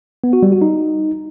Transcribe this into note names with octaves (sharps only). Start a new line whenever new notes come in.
B3
F#4
G3
F#4
D#4